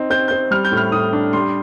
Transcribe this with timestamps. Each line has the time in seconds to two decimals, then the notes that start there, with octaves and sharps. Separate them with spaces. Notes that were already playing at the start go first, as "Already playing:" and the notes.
Already playing: C4 D#4
0.10 C4 G6
0.28 C4 G6
0.51 G3 F6
0.65 G6
0.72 A2
0.77 F6
0.92 A2 D#6
1.13 D4
1.33 G3 C6